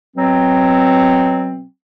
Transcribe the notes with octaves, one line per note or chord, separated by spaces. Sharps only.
B2 F#3 C4